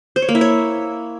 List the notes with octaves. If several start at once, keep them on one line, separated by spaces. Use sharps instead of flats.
C5
C#5
A#3
E4
C#5